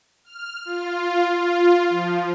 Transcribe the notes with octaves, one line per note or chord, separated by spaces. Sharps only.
F6
F4
F4
F3